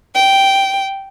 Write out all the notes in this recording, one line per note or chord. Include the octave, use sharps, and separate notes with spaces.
G5